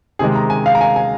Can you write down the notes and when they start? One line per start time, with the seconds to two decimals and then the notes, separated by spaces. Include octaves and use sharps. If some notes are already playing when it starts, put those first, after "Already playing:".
0.19 C3 D#3 G#3 G#4
0.35 A#5
0.50 G#5
0.66 F5
0.75 A#5
0.81 G#5
0.96 G#5